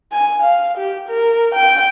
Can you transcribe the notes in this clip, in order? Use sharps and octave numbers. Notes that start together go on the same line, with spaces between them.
G#5
F5
G4
A#4
G5